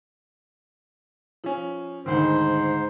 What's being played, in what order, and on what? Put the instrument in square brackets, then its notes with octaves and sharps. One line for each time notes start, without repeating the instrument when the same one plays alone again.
[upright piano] F3 C#4
[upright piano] D2 D#3 [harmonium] G#2 C5